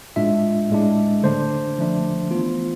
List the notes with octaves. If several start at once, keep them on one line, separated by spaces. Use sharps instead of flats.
A2 G#3 D4 F4 E5
A2 G#3 D4
D3 A3 D4 C5
D3 F3 A3 D4
E3 B3 F4